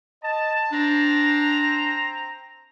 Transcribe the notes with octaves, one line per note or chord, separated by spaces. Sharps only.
D#5 A5
C4 D4 C5 A#5